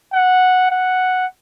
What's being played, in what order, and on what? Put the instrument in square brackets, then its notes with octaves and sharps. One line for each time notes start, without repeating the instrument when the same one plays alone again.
[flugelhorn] F#5
F#5